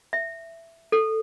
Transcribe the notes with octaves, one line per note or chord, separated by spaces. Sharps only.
E5
A4